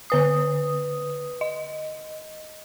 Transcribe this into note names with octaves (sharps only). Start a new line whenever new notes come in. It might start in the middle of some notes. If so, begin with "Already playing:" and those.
D3 B4 D#6
D#5